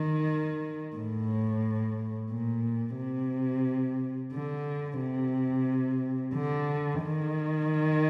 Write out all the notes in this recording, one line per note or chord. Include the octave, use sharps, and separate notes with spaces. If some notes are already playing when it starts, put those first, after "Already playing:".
Already playing: D#3
A2
A#2
C3
D3
C3
D3
D#3